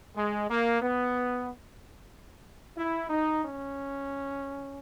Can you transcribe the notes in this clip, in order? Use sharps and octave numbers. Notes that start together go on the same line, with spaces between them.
G#3
A#3
B3
E4
D#4
C#4